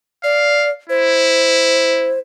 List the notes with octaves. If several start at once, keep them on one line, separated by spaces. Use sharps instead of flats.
D5 F5
E4 C5